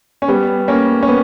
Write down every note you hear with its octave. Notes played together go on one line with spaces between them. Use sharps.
C#4
G3 B3
A#3 C#4
C#4
B3